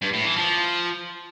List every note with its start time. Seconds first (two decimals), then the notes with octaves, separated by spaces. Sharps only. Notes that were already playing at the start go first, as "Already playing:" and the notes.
0.02 G2
0.13 A2
0.25 E3
0.37 F3